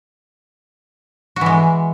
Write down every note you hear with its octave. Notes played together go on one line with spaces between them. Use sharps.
E3 G#3 F#4